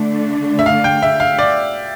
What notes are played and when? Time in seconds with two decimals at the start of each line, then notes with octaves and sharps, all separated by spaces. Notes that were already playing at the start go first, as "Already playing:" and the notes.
Already playing: D3 A3 D4
0.59 E5
0.66 F5
0.84 G5
1.02 E5
1.20 F5
1.39 D5